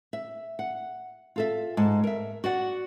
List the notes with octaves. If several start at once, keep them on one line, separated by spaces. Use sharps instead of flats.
E5
F#5
F4 A4 E5
G#2 A5
A#4 E5
F#4 D5 F#5